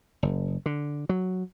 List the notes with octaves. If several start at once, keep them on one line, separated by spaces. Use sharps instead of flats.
F#1
D3
F#3